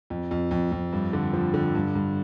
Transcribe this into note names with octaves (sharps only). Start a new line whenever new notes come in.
F2
F2
F2
F2
G2
D3
F3
D3
G2
G2